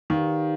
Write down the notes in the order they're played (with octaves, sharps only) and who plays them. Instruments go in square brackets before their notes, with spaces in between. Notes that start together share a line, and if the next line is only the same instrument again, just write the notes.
[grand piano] D#3 [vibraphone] D#4 G4 B4 D5 F5